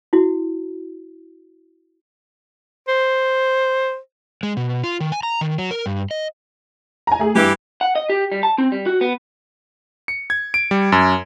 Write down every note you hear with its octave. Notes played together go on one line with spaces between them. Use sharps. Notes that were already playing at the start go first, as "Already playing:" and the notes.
E4 F#4
C5
G#3
B2
F4
D#3
G#5
A#5
D#3
F#3
A#4
G2
D#5
G#5 A#5
A3 G#4
G2 E3 G3 G4
F#5
D#5
G4
G3
A5
C4
G3
F#4
B3
C#7
G#6
D7
G3
F#2